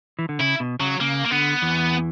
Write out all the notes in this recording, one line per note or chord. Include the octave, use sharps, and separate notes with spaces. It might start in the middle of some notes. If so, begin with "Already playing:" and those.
E3
D3
C#3 E4
B2
C#3 F#3
C#3 A#3
A#3
D3 B3
E2 E3